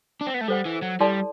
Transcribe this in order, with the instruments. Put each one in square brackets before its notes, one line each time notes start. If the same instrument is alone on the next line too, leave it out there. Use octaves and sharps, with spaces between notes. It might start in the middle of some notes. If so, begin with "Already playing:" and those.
[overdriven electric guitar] D4
C4
B3
A3
[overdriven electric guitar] G3 [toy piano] A4 C5 F#5
[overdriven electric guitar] E3
F#3
[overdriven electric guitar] G3 [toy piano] E4 A4 D5 A5 C6